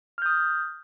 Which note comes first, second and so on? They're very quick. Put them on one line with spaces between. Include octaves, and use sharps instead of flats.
F6 G6 D#6